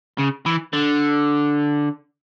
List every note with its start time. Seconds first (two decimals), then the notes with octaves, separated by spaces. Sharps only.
0.18 C#3
0.46 E3
0.73 D3